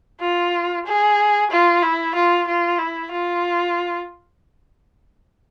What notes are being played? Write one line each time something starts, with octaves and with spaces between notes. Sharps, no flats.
F4
G#4
F4
E4
F4
F4
E4
F4